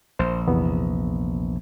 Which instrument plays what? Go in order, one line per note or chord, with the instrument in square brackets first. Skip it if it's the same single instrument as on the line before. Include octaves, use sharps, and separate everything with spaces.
[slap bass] A#1 [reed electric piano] C5
[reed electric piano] E2 C3 B3